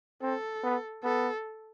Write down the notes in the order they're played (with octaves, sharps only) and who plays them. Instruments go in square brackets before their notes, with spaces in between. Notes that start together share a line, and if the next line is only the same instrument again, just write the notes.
[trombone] C4 [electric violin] A4
[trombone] B3
[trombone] B3 [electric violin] A4